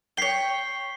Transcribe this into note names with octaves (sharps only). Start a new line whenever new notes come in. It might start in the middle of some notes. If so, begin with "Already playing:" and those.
C#5 G5 B6 C7 G7